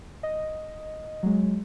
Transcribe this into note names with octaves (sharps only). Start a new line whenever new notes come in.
D#5
F#3 G#3